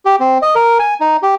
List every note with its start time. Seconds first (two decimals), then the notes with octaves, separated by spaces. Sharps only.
0.05 G4
0.20 C4
0.42 D#5
0.55 A#4
0.79 G#5
1.00 D#4
1.22 G4